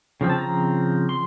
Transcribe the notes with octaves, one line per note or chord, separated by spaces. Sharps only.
C#3 F3 C4
A5
A#5
C6